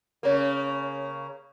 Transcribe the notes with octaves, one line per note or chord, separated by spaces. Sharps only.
C#3 A#3